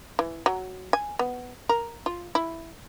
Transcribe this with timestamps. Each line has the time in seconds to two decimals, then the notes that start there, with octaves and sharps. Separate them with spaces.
0.19 E3
0.46 F#3
0.93 G#5
1.19 B3
1.69 A#4
2.06 F4
2.35 E4